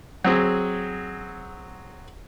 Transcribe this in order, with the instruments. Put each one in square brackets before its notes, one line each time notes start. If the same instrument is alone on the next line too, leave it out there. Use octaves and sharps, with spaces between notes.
[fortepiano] F#3 C4 G#4